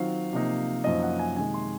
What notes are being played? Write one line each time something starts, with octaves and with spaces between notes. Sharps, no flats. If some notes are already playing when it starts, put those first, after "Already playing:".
Already playing: D#3 F#3 C4 F4 F5
C3 F3 A#3 D#4
F#2 F3 A#3 D#4 D#5
F#5
G#5
C3 D#3 G#3 G#5
C6